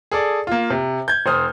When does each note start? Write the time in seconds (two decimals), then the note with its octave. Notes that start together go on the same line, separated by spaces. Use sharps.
0.12 G#4 A4 D5
0.47 A#3 F4
0.70 C3
1.08 G6 G#6
1.26 F1 C5 D#6 F6